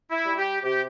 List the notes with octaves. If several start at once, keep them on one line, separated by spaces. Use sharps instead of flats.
E4
G3
G4
C3 G4